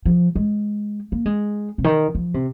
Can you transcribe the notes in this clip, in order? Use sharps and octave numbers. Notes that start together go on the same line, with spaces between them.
F3
G#3
A#3
G#3
C3
D#3
F3
C3